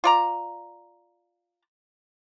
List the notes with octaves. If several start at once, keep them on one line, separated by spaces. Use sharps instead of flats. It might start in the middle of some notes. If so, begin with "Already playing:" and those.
F4 D5 A#5